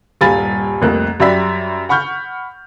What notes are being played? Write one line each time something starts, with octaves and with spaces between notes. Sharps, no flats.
D#1 G2 F5 G#5 B5 A6
C2 F2 A3 A#3 F#6
F#2 G3 D5 E5 B5 B6
F#5 B5 C#6 F6 G6